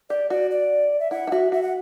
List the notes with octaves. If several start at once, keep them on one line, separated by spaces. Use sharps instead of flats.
G4 D5
F#4 D5
D5
E5
E4 F#5
E4
F#4 E5
F#4 E5
F#5